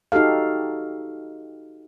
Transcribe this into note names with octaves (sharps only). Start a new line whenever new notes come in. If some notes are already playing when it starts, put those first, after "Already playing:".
D#4 F#4 G4 A4 F5